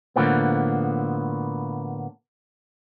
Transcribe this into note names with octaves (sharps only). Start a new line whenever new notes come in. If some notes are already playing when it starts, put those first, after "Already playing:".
A2 D3 F3 A#3 B3